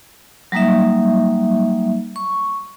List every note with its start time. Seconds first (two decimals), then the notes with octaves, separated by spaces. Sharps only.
0.52 F#3 G3 A#3 D#4 E5
2.16 C#6